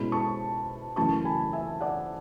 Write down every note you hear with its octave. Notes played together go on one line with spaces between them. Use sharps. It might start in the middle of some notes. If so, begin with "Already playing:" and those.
Already playing: B2 G#3 C#4 E4 B5
A5 C#6
F#2 C#3 E3 A3 A5 C#6
G#5 B5
E5 G#5
D5 F#5